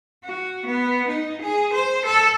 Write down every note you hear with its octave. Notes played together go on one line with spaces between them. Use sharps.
F#4
B3
D#4
G#4
C5
A4